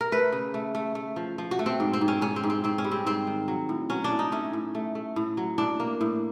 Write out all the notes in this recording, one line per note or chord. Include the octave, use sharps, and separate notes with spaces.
A#4
A3 B4
C#3
A3
A3
A3
F3
F3
F#4
A3
C4
G#2
C4
G#2
C#4
G#2 C#4
C4
G#2
C4
G#2 C4
C#4
G3
C4
G#2 C4
D#3
F#3
A2
F#3 C#4
D4
A2
D#4
A3 C#4
A2
A3
A3
A2
F#3
A2 D4
A#3
A2